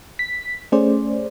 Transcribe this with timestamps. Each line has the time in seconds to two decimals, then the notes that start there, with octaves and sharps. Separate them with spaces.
0.19 B6
0.72 A3 C#4 G#4 C5 D5